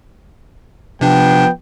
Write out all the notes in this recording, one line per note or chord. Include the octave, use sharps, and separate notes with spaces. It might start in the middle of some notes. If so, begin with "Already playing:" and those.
C3 F3 B3 D4 G5